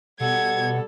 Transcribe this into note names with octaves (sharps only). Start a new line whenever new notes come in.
B2 G3 A4 F#5 G#6